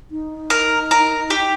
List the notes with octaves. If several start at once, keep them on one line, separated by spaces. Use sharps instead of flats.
D#4
A#4
A#4
G4